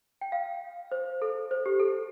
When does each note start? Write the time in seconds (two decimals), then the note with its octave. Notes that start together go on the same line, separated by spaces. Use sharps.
0.21 G5
0.32 F5
0.91 C5
1.22 A4
1.51 C5
1.66 G4
1.80 A4